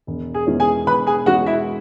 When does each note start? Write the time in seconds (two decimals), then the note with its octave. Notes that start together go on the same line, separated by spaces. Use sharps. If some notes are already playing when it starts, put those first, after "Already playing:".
0.07 E1
0.34 G#4
0.47 E2 E3 G#3 C#4
0.60 G#4 G#5
0.86 E1 B4 B5
1.07 G#4 G#5
1.26 E2 E3 G#3 C#4 F#4 F#5
1.46 E4 E5